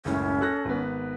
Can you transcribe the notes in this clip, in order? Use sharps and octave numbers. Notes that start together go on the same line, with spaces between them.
F#1 C#2 A2 C#4
A4 F#6 A#6
G#1 B3